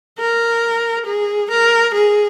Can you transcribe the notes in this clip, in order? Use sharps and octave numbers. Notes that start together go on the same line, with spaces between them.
A#4
G#4
A#4
G#4